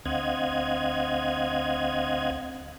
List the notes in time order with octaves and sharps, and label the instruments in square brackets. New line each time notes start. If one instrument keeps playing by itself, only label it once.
[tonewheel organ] D2 C4 D#5 F5 F#5 G#6